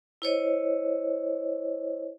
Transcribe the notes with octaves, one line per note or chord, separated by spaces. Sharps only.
E4 C5 C#5 D#5